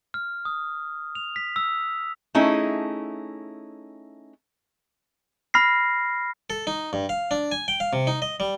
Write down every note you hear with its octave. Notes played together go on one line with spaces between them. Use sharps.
F6
D#6
F7
B6
E6
A3 C#4 D#4 E4 G#4
B5 F6 A#6 C7
A4
D#4
G2
F5
D4
G#5
G5
F5
C3
D#4
D#5
G3